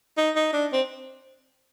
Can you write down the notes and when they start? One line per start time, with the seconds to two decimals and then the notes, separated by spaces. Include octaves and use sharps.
0.17 D#4
0.36 D#4
0.53 D4
0.73 C4